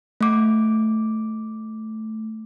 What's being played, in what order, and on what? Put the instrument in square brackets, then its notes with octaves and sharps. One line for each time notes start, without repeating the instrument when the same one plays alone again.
[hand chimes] A3 D6